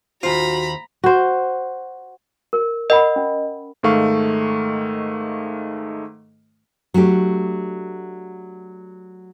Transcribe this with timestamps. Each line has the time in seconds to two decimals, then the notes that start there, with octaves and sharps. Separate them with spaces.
0.23 D#2 F4 F#4 C5 A#5 B5
1.04 F#4 C5
2.53 A#4
2.90 A#4 D#5 F#5 B5
3.16 C#4
3.83 G#2 D#3 A3 F5 C#6
6.94 F#3 A3 D4 G4